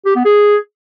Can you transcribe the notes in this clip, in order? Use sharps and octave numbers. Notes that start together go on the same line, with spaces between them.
G4
B3
G#4